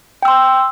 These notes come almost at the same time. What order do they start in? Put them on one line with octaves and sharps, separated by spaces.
G5 E6 C6